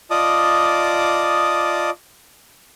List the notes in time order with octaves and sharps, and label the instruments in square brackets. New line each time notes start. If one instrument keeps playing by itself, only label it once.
[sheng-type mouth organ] F4 D5 D#5 A5 D6 D#6